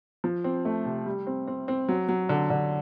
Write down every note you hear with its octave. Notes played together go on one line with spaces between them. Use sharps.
F3
C4
A3
C3
G3
C4
C4
C4
F#3
F#3
D3
D3